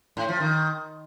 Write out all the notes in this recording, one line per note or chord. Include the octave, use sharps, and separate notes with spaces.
A2
F3
D#3